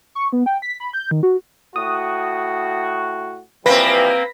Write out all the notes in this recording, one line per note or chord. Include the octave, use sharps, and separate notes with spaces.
C#6
B3
G5
B6
B5
G6
D#3
F#4
A2 F#4 D#6
E3 F3 G3 A#3 C4 B4 A#6 B6